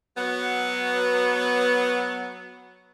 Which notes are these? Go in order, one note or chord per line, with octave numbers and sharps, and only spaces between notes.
F#3 B3